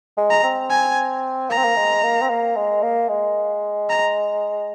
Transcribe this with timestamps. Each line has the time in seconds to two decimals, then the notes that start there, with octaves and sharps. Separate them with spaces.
0.17 G#3
0.30 A#5
0.44 C4
0.70 G#5
1.50 A#3 A#5
1.58 C4
1.64 A#3
1.76 G#3
2.03 A#3
2.22 C4
2.30 A#3
2.56 G#3
2.83 A#3
3.09 G#3
3.89 A#5